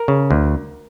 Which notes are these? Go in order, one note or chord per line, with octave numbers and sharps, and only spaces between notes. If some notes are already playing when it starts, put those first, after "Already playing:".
Already playing: A#4
C#3
D2